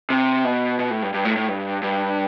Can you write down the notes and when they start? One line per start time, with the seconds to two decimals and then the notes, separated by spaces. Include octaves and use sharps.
0.10 C3
0.44 B2
0.79 B2
0.90 A2
1.02 G2
1.14 G2
1.25 A2
1.37 A2
1.48 G2
1.83 G2